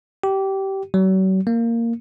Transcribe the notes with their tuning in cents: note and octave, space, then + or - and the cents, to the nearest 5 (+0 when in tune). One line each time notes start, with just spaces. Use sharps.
G4 -20
F#3 +40
A#3 -10